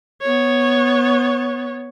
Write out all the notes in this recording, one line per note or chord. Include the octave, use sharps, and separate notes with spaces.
B3 C#5